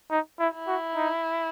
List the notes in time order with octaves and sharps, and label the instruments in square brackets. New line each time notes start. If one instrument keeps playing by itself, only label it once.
[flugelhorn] D#4
E4
[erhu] E4
[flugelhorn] F#4
D#4